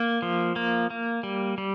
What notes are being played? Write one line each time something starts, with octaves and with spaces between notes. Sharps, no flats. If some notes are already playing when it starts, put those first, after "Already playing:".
Already playing: A#3
F3
A#3
A#3
G3
G3